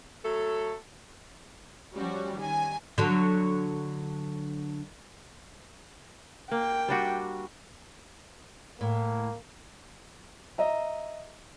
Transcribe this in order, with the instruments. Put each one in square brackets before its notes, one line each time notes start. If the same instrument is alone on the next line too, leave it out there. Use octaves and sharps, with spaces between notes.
[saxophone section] F#3 A3 A4
[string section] F3 G3 C#4 F#4
D#3 G#5
[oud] D3 F#3
[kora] A#3 [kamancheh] G5
[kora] G3 D4 F#4
[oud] A2 [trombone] A#3
[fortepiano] D#5 E5 A#5